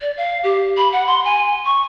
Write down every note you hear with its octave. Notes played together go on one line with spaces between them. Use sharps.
D5
F5
G4
B5
F#5
C6
G#5
C#6